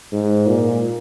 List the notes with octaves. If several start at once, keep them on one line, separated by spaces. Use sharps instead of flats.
G#2
A#2